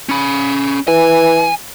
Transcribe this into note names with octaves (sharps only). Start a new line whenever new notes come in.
C#4 B5
E3 G#5